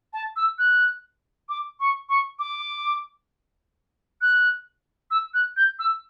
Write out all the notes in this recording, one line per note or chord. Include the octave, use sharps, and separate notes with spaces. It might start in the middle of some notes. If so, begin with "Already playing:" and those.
A5
E6
F#6
D6
C#6
C#6
D6
F#6
E6
F#6
G6
E6